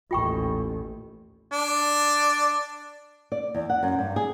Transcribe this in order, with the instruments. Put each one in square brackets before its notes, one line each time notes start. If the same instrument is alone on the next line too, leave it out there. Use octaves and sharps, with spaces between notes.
[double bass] A1 D#2 [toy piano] F4 G5 C#6
[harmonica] D4 D5
[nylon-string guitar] D5
E2
F#5
F#2
G2
G#4